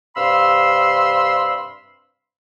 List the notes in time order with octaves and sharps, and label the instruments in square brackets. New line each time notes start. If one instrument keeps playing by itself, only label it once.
[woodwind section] G2 C3 F5 B5 C6 E6